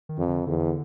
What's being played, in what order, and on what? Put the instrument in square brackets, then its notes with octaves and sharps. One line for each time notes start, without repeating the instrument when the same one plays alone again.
[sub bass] D#3
[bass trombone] F2
[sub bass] D3
[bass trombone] E2 [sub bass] D3